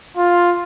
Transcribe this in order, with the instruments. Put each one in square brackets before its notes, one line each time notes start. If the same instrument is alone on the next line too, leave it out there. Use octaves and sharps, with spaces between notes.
[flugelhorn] F4